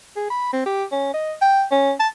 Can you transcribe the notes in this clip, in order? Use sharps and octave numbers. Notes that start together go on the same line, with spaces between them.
G#4
B5
C4
G4
C#4
D#5
G5
C#4
A5